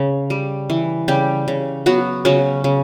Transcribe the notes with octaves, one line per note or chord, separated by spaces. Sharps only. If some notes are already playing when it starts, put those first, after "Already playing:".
Already playing: C#3
G3
E3
C#3 G3 G4
C#3
F#3 B3 F#4
C#3 F#3 C#4
C#3